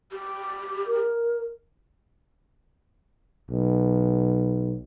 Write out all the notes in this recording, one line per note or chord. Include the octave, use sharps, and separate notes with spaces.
G4
A#4
B1